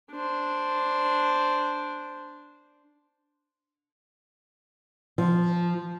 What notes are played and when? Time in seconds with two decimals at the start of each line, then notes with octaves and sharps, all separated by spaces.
0.11 D4 C5
5.18 F3